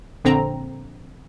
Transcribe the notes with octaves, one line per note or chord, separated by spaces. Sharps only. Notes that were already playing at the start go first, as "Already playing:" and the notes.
A#1 D3 C4 A#5